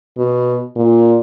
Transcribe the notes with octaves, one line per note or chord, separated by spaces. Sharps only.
B2
A#2